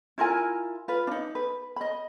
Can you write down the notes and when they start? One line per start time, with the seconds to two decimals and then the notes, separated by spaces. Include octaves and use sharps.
0.18 E4 F4 A#4 G#5
0.88 F4 B4
1.07 D4 D#4
1.35 B4
1.76 D#5 B5